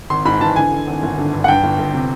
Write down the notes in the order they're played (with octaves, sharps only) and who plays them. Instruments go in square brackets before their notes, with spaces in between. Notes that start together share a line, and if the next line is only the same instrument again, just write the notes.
[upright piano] G#1 C6
G#2 B5
E3 A5
D3 G#5
D3
G#1
G1
D3
G2
F#5
G2 G5
G1
G1
C3